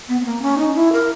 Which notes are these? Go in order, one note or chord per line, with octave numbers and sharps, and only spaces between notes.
B3
B3
A#3
C#4
D#4
E4
A#4